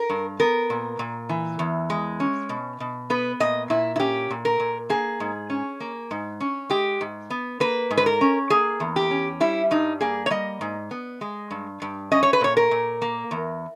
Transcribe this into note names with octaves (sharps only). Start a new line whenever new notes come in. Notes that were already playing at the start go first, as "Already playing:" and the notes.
Already playing: A#4
G2
B3 A#4
A#2
A#2
E3
E2
G#3
C#4
B2
B2
B3 B4
A#2 D#5
A#2 E4
E4
C#4 G4
A#2
A#4
A#2
A#3 G#4
G#2
C#4
A#3
G#2
C#4
G#3 G4
G#2
B3
A#3 B4
G#2
B4
A#4
C#4
A#3 G#4
E2
G4
C#4
G3 E4
G2 D#4
A#3 G#4
C#5
G3 D#5
G#2
B3
G#3
G2
G2
C#4 D#5
C#5
B4
A#2 C#5
A#4
A#2
A#3
E2